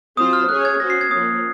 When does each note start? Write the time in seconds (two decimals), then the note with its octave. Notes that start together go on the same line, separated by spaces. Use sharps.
0.17 F#3 C4 F4 C5 D#6
0.33 F6
0.49 C#4 G#4 C#5 F#6
0.65 G#6
0.80 C#4 F#4 C5 A#6
0.90 C7
1.01 G#6
1.11 F3 A#3 C#4 D#6